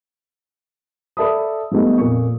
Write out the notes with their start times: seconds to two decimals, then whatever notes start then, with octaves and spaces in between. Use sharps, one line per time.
1.17 A4 D5 E5 A5 B5 D#6
1.71 F3 G3 A3 B3 D#4
1.98 F2 A#2 C#6